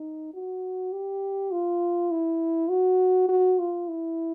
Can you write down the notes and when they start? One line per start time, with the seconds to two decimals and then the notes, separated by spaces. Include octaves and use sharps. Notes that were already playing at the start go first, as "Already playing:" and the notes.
Already playing: D#4
0.34 F#4
0.93 G4
1.52 F4
2.11 E4
2.70 F#4
3.29 F#4
3.59 F4
3.88 E4